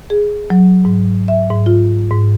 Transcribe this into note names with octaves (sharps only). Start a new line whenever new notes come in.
G#4
F#3
G#2
E5
G#2
F4
G#2